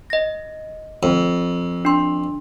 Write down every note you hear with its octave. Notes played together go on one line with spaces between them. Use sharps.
D#5 A#6
F2
D4 C6